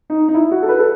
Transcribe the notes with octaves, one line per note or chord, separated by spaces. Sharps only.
D#4
D#4
E4
F#4
A4
B4
A4